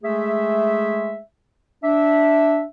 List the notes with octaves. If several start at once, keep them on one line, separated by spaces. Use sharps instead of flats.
G#3 A3 G#4 E5
D4 E5